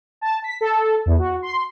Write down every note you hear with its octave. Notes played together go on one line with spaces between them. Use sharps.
A5
B6
A4
E2
F#4
C6